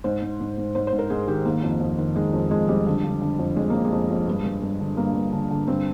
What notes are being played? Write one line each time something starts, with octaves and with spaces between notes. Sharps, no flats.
G#2 C5
G#2
G#2
G#2
G#2 C5
C5
G#2
A#4
G#2 G#4
D#3 G4
D#3 A#3
F2
F2
D#3
D#3 G#3
F2
F2 G#3
F2 G3
D3
D3
D3
F2
F2 G#3
F2 A#3
G#3
F2
F2
G2
G2
G2
D3
G2 A#3
G2
D3
D3
G2 C4